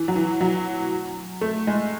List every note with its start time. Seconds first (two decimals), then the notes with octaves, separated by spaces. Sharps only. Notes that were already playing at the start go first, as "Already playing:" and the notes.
Already playing: E3
0.08 F#3
0.16 E3
0.41 F#3
1.41 A3
1.67 G#3